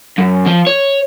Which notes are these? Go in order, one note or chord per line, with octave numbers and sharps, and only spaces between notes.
F#2
F3
C#5